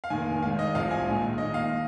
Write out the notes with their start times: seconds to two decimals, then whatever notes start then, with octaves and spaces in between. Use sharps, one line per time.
0.04 F5
0.10 F1 D#2 D#3 G#5
0.42 G#1 G#2 D#3 F5
0.59 D#5
0.75 C2 C3 F3 F5
0.91 G#5
1.07 A#1 G#2 D#3
1.38 D#2 D#3 D#5
1.54 F5